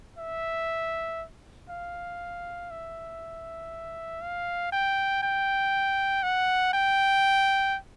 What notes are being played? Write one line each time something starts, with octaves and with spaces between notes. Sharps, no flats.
E5
F5
E5
F5
G5
G5
F#5
G5